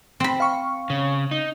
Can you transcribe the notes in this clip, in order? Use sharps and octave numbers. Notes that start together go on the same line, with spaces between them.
C4 B5
F5 C#6
C#3
D#4